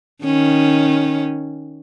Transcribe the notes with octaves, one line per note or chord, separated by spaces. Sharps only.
D#3 C#4